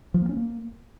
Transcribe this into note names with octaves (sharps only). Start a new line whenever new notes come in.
F3
A#3
C#4
A#3